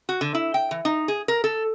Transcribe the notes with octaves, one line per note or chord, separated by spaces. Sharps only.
F#4
D3
E4
G5
E3
D#4
G#4
A#4
A4